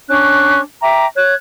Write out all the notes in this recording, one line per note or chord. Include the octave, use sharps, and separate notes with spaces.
C#4 D4 C#6 F#6
E5 G5 A#5 D6
C#5 F#6 G#6